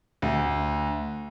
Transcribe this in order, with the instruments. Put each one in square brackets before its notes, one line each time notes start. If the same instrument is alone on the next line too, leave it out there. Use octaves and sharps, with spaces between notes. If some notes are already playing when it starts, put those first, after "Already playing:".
[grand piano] D2